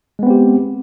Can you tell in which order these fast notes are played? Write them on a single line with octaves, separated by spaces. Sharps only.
G#3 B3 C4 G4